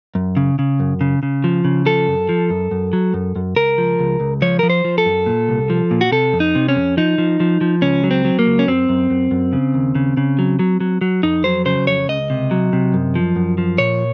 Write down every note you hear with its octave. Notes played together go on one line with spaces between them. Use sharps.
F#2
C#3
C#3
F#2
C#3
C#3
F3
C#3
F3 A4
F#2
F3
F#2
F#2
F#3
F#2
F#2
C#2 A#4
F3
C#2
C#2
F3 C#5
F3 A#4
C5
F3
A4
F#2
A#2
C2
F3
A#2
F#4
C3 A4
F2
D#4
C3
C#4
F2
F3 D#4
F3
F3
F3
C#2 C#4
F#3
C4
F#3
A#3
C#2
C#4
F#2 C4
F#2
F#2
F#2
C#3
D#2
C#3
C#3
F#3
F#3
F#3
F#3
F2 D#4
F#3 C5
C#3 C5
F2 C#5
C#2 D#5
C3
F#3
C3
F#2
F3
F#2
F3
A#2 C#5